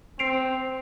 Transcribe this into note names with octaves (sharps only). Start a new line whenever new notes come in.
C4 C7 D7 F7